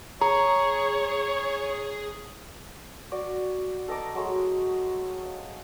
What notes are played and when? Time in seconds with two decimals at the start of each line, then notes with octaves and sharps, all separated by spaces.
0.21 G#4 C#5 A#5
3.11 F#4 D5
3.88 A4 D#5 A#5 D6
4.15 F#3 G#3 A3
5.25 F5